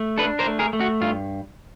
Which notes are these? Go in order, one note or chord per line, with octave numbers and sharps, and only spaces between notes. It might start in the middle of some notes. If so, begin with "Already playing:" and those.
Already playing: A3
D4 A4 B4
A#4 C5
A3
G#4 A#4
A3
F#4
G2 F4